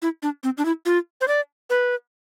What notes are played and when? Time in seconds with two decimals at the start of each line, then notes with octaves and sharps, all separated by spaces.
0.02 E4
0.23 D4
0.44 C4
0.58 D4
0.65 E4
0.86 F4
1.21 C5
1.28 D5
1.70 B4